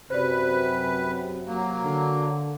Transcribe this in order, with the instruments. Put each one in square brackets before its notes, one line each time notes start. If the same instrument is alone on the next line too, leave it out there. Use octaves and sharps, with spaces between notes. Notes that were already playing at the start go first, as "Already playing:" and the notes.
[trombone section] F#2 C3 [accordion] B4 [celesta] C5 D5
[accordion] F#3 A#3
[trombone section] D3